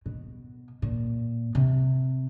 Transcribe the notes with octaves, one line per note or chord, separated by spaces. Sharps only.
B2
A#2
C3